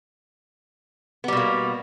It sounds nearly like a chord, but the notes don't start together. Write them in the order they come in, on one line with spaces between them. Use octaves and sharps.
B3 G3 B2 A#3